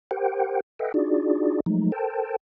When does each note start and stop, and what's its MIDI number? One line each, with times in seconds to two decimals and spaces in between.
0.11 0.60 67
0.11 0.60 70
0.11 0.60 72
0.11 0.60 78
0.11 0.60 79
0.79 0.92 69
0.79 0.92 71
0.79 0.92 75
0.79 0.92 76
0.79 0.92 78
0.79 0.92 79
0.94 1.60 62
0.94 1.60 63
0.94 1.60 65
0.94 1.60 66
0.94 1.60 68
0.94 1.60 74
1.66 1.92 53
1.66 1.92 54
1.66 1.92 56
1.66 1.92 57
1.66 1.92 63
1.92 2.36 69
1.92 2.36 70
1.92 2.36 72
1.92 2.36 79
1.92 2.36 81